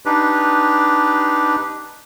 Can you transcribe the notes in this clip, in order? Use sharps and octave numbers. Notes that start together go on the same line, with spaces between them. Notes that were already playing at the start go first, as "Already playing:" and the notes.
D4 D#4 G4 B4